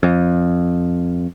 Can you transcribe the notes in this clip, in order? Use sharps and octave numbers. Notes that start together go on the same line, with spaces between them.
F2